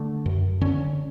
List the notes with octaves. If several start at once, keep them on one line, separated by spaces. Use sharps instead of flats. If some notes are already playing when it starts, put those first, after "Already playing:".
Already playing: D3 A3
F#2
D3 C#4